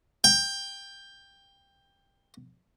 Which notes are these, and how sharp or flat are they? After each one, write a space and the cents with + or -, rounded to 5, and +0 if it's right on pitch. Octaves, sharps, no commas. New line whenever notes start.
G5 +15